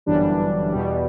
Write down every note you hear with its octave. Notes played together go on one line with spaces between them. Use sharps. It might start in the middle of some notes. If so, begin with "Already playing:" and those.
G1 F#2 E3 G3 D4
E2 B2 G3